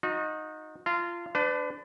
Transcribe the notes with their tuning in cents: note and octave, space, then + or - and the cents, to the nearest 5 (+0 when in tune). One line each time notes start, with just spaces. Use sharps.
D#4 +0 F#4 -35
F4 -20 A5 +45
D4 +0 B4 +40